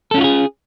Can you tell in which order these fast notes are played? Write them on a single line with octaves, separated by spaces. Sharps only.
A4 C#4 F4 F#4 G#4